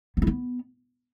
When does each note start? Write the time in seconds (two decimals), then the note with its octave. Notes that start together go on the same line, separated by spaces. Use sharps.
0.17 B3
0.22 E4
0.27 B3